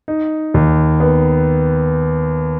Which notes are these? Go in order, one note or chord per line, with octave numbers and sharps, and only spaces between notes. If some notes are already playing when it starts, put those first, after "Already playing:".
D#4
D#2
B3